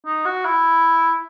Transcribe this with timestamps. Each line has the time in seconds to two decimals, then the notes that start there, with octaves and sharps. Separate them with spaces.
0.06 D#4
0.25 F#4
0.45 E4